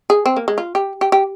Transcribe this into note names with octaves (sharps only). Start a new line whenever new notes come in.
G#4
C4
A#3
G#3
F4
G4
G4
G4